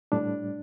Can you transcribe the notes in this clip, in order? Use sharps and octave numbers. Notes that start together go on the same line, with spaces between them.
A2 G3 D4